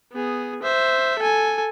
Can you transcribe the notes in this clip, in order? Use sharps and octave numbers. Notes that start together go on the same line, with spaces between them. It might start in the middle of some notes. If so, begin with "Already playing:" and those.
B3 G#4
C5 E5
A4 G#5